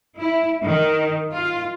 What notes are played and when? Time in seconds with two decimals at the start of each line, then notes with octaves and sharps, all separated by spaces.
0.19 E4
0.65 D#3
1.33 F4